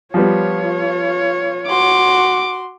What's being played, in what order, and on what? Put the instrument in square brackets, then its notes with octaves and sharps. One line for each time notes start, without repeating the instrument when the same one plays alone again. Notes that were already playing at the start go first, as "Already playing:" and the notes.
[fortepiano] F3 G3 B3 [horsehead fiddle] F4 C#5
[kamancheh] F#4 C6 [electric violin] D6